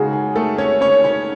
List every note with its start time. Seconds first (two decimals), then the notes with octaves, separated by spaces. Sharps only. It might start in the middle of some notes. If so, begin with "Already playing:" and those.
Already playing: C#3 G#3 D#4 F#4 G#4
0.13 G#4
0.36 A3 A4
0.58 C#4 C#5
0.81 C#4 C#5
1.04 C#4 C#5